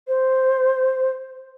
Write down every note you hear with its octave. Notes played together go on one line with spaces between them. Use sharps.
C5